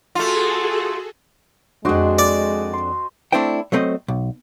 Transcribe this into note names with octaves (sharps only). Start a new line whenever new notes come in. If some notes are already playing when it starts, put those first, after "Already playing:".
A3 F4 F#4 G#4 A4
F2 G#3 D4 F#4 C5 D#5
D5
C6
A3 C4 D4 E4 C5 G5
F#3 A3 C4 A#4 C5 D#5
B1